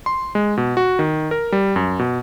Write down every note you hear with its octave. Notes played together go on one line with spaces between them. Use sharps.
C6
G#3
B2
F#4
D#3
A#4
G3
F#2
B2